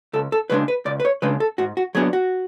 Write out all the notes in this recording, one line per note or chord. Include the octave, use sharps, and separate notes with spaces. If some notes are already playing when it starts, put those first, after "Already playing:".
C#2 A4
A4
C#3 G#3 D4 B4
B4
C#2 D5
B4
C#5
C#3 G#3 D4 B4
A4
G#2 F#4
F#4
F#3 B3 D4 G#4
F#4